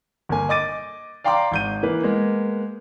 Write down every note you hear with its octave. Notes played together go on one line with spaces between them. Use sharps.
G1 A#3 G#5
D#5 D6 A6 D#7
D5 F5 G5 A#5 C6 D6
G#1 G6 D#7
E3 A#3 B4
G#3 A#3 B3